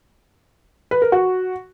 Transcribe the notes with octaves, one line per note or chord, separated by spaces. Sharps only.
B4
A#4
F#4